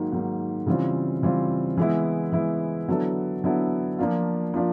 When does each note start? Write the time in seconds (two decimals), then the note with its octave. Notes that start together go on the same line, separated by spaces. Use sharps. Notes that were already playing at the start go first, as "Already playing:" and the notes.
Already playing: G#2 D#3 F#3 A#3
0.12 G#2 D#3 F#3 A#3
0.66 C#3 E3 G3 C4 F4
1.22 C#3 E3 G3 C4 F4
1.77 E3 G#3 B3 E4
2.32 E3 G#3 B3 E4
2.88 D3 F#3 B3 E4 A4
3.44 D3 F#3 B3 E4 A4
3.99 F3 A#3 D4 F4
4.54 F3 A#3 D4 F4